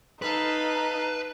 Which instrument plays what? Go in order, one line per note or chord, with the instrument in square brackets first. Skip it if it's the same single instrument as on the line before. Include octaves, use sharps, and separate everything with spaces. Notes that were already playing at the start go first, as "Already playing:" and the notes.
[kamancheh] D#4 [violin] A4 F5 [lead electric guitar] B4